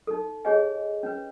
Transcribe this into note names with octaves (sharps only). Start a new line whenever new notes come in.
D#4 A4
G4 G#4 C#5 D#5 G#5
C#4 B4